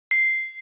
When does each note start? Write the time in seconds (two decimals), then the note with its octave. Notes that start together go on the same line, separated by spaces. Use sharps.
0.11 C7